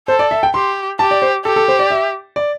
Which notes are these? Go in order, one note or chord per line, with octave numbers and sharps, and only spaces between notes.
A4 C5
D5
E5
G5
G4 C6
G4 A5
D5
C5
G4 A4
A4
C5
D5
E5
D5